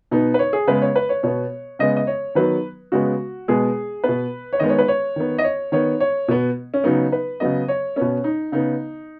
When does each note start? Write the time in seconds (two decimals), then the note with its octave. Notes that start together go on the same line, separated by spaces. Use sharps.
0.11 B2 B3 D#4
0.34 B4
0.39 C#5
0.53 G#4
0.67 C#3 G#3 B3 B4
0.82 C#5
0.96 B4
1.09 C#5
1.23 B2 B3 C#5
1.79 C#3 G#3 B3 D#5
1.96 D#5
2.07 C#5
2.35 D#3 F#3 B3 B4
2.92 C#3 G#3 B3 F#4
3.48 B2 G#3 B3 G#4
4.04 B2 B3 B4
4.53 C#5
4.59 D#3 G#3 B3 D#5
4.69 C#5
4.79 B4
4.88 C#5
5.16 D#3 B3
5.38 D#5
5.44 C#5
5.72 D#3 B3 C#5
6.00 C#5
6.28 B2 B3
6.74 C#4
6.84 C#3 F#3 B3 D#4
7.12 B4
7.40 C#3 F#3 B3 D#5
7.68 C#5
7.96 B2 B3 C#4
8.24 D#4
8.52 C#3 B3 D#4